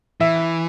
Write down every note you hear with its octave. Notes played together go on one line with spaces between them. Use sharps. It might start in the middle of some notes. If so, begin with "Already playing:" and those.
E3 E5